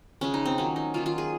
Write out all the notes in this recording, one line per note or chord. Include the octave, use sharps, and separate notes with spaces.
C#3 F3 G#3 C#4
D#4
C4
D#3 F#3 A#3 C#4
D#4
D#3 F#3 A#3 F4
F4
G#4